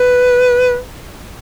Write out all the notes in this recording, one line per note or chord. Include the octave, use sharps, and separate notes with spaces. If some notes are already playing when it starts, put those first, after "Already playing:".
Already playing: B4